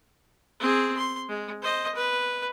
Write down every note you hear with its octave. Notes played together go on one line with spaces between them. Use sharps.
C4 G#4
C6
G#3
C5 D#5
B4